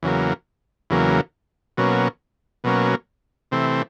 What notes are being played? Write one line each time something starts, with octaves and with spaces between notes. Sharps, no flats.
E2 C#3 F#3 A#3
E2 C#3 F#3 A#3
B2 F#3 A#3 C#4
B2 F#3 A#3 C#4
C3 E3 A3 C4